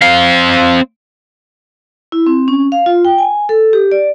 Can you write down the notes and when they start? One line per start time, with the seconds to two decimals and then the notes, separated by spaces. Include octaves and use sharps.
0.02 C4 F5
2.12 E4
2.27 C4
2.48 C#4
2.72 F5
2.86 F4
3.05 G5
3.18 G#5
3.49 A4
3.73 G4
3.92 D5